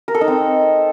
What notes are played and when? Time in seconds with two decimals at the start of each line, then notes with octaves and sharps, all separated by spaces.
0.08 A#4
0.15 A4
0.21 D#4
0.28 C4